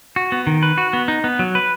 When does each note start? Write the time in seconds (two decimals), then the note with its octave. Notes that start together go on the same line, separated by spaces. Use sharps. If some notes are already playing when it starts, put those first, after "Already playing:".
0.16 F#4
0.32 B3
0.47 D#3
0.63 B4
0.78 F#4
0.93 B3
1.08 D#4
1.24 B3
1.39 F#3
1.55 B4